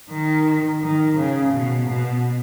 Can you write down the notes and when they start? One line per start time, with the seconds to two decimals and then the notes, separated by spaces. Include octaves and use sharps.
0.10 D#3
0.82 D#3
1.18 C#3
1.54 B2
1.90 B2